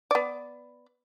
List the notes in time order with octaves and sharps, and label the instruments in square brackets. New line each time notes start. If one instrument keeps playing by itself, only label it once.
[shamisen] B3 D5